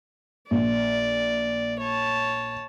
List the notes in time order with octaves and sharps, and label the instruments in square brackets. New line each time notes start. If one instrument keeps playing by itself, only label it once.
[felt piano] A#1 [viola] D5
[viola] C#5 A5